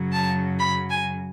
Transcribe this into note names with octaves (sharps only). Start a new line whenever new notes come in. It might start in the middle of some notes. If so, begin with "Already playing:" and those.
Already playing: F#2 C#3 F#3
A5
B5
G#5